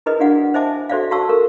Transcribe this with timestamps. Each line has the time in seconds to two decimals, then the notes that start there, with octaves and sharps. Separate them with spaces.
0.06 E4 G#4 A#4 B4 D#5 D#6
0.20 D4 F#4 G#4 D5 F5 F#5
0.54 C5 D#5 E5 G#5 A5 D6
0.89 F#4 A4 C5 D5 E5 F5
1.11 F#4 F5 A5 C#6 E6
1.29 A4 A#4